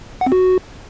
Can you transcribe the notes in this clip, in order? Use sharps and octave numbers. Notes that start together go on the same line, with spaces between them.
F#5
C4
F#4